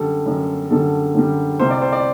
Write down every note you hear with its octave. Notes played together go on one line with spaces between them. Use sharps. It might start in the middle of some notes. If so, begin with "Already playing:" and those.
Already playing: F#2 D3 G3 A4
F#2 D3 G3
F#2 D3 G3 A4
F#2 D3 G3
C2 C3 G3 C5
D5
C5
D5